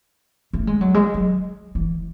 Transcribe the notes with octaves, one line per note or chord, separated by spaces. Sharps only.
A3
G#3
F#3
G#3
F#3
E3